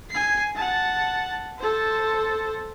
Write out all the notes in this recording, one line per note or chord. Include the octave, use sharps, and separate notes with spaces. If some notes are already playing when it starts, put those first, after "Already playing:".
G#5 C7
F#5 A5
A4 C5